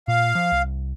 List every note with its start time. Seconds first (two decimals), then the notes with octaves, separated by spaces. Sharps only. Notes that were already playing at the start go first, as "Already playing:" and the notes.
0.08 A#2 F5
0.35 F3
0.52 C2